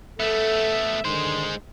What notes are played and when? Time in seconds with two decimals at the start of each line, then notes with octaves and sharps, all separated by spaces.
0.20 A3 B3 A4 E5
1.05 D3 D#3 G#3 C5 C6